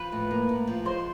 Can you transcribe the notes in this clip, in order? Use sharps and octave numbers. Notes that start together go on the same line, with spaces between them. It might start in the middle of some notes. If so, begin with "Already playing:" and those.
Already playing: F3 B4
A2
A#3
A2
F3
G#3 C5